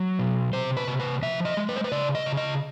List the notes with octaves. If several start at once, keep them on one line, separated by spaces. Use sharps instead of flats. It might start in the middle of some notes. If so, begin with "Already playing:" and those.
Already playing: F#3
B2
C3 C5
B4
C3
B4
F3 E5
D#5
G#3
B4
C5
B4
C#3 D5
D#5
C#3
D#5